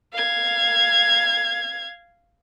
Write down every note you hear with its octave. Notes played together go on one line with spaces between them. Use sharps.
F5 G#6